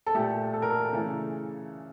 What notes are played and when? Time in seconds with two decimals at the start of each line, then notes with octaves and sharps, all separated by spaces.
0.07 A4
0.15 A#2 A3 G4
0.54 A4
0.62 A#4
0.70 A4
0.93 C#3 E3 A3